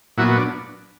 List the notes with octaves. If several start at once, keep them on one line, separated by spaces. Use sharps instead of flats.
A#2 F#3 B3 E4 F#4
D4